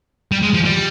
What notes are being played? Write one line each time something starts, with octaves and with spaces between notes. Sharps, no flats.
G3
G#3
F3
G3